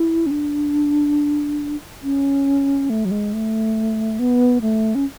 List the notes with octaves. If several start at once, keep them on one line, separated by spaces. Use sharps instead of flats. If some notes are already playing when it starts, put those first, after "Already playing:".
Already playing: E4
C#4
D4
C#4
A3
F#3
G#3
A3
B3
A3
C#4